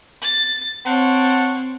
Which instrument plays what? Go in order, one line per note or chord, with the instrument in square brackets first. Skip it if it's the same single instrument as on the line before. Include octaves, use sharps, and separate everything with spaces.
[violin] A6
[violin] C4 [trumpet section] C#5 F#5 A5